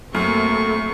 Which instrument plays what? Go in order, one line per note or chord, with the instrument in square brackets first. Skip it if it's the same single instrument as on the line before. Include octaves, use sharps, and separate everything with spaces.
[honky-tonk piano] F#2 [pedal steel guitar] A3 [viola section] A#3 C4 A4 [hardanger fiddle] C#6